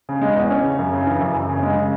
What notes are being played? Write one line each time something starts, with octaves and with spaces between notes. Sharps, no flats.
C#3
G#3
E2
C#4
C#3
F#2
C#3
E3
F#2
F#2
C#3
G#3
C#3